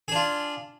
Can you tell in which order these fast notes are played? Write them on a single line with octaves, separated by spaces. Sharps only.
G#4 D4 F4